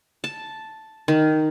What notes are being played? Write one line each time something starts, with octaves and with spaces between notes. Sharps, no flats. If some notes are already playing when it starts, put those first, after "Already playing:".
A5
D#3